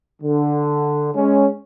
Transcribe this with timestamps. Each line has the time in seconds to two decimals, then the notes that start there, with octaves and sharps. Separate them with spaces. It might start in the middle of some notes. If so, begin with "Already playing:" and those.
0.22 D3
1.14 G#3 C#4